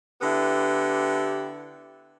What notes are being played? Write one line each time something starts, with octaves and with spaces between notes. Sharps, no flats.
D3 B3 E4 G4